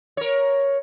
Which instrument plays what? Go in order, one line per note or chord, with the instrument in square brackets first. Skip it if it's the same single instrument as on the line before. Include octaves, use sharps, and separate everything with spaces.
[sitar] A#4 C#5